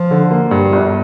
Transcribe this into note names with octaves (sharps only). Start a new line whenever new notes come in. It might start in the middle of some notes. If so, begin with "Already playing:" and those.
Already playing: F3
D3
A#3
G2
G1